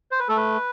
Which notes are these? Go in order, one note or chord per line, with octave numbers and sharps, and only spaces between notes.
C5
B4
A3 A4
B4